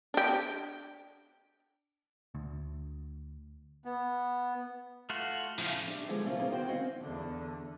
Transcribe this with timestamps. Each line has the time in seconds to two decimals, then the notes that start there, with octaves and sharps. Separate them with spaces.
0.14 D4 G4
2.35 D2
3.85 B3
5.10 A3 F4 F#4
5.58 A2 C#3 F3 A3
5.88 D4 G4 E5
6.09 D3 F3 G#3 A3 B3
6.26 C3 A3 A#3 C#4 E4 F4
6.37 C3 A#3 B3
6.52 D2 D#3 F#4 C5 G5
6.67 C4 C#4 E4 F#4 D#5 F5
7.01 E2 D3